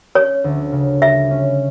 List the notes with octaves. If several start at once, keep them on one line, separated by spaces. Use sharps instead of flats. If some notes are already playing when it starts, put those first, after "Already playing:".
C#4 C#5
D2
C#3
G3 E5
C#4